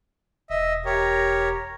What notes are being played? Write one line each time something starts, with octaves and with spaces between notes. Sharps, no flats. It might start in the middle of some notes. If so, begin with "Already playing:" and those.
E1 D#5 E5
G4 A#4 C#5